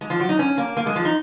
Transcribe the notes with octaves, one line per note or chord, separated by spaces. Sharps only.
G#3
F3
F#3
D#4
C#4
A#3
A#3
G#3
F3
D#4